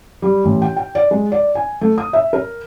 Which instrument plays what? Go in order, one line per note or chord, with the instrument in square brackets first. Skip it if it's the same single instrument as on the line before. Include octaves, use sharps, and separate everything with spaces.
[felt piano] G3
A1
G5
G5
D5
G#3
D5
G#5
A3
D#6
E5
A#4